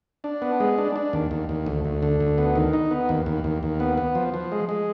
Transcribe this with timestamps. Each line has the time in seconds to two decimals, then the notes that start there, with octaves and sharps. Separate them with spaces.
0.24 D4
0.42 B3
0.60 G#3
0.78 D4
0.96 D4
1.13 D#2
1.31 D#2
1.49 D#2
1.66 D2
1.85 D2
2.03 D3
2.20 D2
2.38 B3
2.56 D#3
2.73 D#4
2.91 B3
3.09 D#2
3.26 D#2
3.44 D#2
3.63 D#2
3.80 B3
3.98 B3
4.15 F3
4.34 F3
4.52 G#3
4.69 G#3